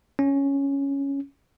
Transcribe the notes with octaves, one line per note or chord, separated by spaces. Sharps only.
C#4